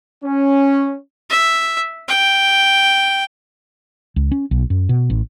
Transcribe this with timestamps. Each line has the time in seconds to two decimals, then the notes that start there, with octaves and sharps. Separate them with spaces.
0.24 C#4
1.30 E5
2.08 G5
4.16 C#2
4.32 C#4
4.51 B1
4.70 F#2
4.89 B2
5.10 A1